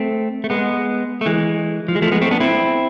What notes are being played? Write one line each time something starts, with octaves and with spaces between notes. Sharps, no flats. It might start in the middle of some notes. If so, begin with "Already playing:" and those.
Already playing: A3 C4
A3
G#3 B3
A3
E3 G#3
F3
G#3
F3 A3
G#3 B3
A3 C4
B3 D4
C4 E4